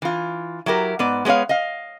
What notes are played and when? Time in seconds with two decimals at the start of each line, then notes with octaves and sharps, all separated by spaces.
0.02 E3 F4
0.66 F#3 E4 G4 A#4
0.99 G#2 B3 D5
1.25 G#3 B3 G4 C#5 F5
1.49 D#5 F5